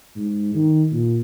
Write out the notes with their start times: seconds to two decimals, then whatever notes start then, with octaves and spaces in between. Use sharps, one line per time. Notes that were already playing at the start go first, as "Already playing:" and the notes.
0.16 G#2
0.55 D#3
0.92 A#2